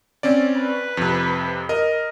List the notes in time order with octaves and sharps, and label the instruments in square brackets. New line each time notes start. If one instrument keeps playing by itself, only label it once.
[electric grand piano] C4 C#4 D5
[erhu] B4
[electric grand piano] F2 C3
A#4 D#5